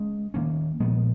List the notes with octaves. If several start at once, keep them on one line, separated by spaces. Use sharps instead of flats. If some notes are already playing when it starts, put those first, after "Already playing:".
Already playing: G#3 C#4
D#3 A#3 C#4
A#2 F3 G#3 B3